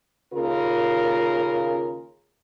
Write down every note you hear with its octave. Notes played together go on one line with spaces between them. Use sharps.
D#2 C#3 F4 A#4